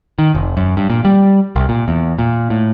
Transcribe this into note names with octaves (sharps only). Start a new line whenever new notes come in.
D#3
F1
F#2
G2
A#2
G3
C2
A#2
E2
A#2
A2